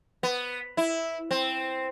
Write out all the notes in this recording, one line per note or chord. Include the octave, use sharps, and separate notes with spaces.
B3
E4
C4